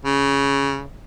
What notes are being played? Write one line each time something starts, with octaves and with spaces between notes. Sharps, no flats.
C#3